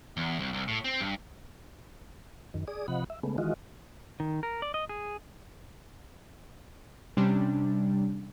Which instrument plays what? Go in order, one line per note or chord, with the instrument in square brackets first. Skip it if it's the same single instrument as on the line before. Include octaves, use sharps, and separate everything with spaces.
[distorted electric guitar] E2
C2
C2
A2
C4
G2
[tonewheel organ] F#2 D#3
G#4 D5 D#6
C3 F3 D#5 F#5 B5
E5
C#3 G#3 A3 B3
D#3 E3 G#3 F4 F#4 D#5
[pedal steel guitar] D#3
A#4
D5
D#5
G#4
[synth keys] C3 G3 C#4 D4